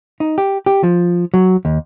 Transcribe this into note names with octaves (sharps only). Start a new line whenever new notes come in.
D#4
G4
G4
F3
F#3
D#2